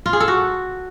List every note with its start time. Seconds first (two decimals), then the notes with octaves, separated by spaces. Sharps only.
0.06 F4
0.13 G#4
0.20 A4
0.28 F#4